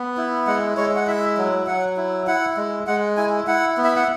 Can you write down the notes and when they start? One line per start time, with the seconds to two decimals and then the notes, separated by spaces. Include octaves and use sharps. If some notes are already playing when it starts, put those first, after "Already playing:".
Already playing: B3
0.17 E4
0.47 G#3 F#5
0.77 G#3 C#5
0.96 F#5
1.07 E4 E5
1.37 F#3
1.67 F#3 F#5
1.97 E4
2.27 E4 F#5
2.57 G#3
2.87 G#3 F#5
3.17 E4 G#5
3.47 E4 F#5
3.77 B3
3.84 E5
3.96 F#5